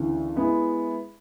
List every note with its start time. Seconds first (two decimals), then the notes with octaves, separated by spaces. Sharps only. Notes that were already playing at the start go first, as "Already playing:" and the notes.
Already playing: D2 C#3 E3
0.36 G#3 B3 E4